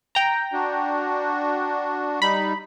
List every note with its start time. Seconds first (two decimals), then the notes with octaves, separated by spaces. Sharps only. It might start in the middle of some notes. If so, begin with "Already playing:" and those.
0.15 G5 A#5
0.53 D4 F#4
2.22 G3 D#4 B5